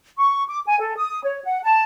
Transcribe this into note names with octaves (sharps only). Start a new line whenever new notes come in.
C#6
D6
G#5
A4
D#6
C#5
F#5
A5